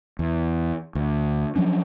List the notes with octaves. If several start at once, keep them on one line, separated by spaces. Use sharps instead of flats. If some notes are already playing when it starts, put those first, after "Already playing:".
E2
D2
F3 F#3 C#4 D4